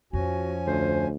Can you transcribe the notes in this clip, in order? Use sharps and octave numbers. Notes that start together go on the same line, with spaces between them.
F2 F3 C#4 F#4 G#5
D2 C5